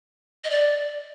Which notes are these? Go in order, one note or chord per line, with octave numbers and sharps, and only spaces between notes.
D#5
D5